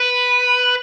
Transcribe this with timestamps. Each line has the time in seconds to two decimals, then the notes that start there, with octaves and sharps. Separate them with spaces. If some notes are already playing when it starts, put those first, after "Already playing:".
Already playing: B4